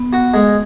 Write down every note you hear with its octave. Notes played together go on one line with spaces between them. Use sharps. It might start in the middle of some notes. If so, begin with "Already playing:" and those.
Already playing: B3
F#4
G#3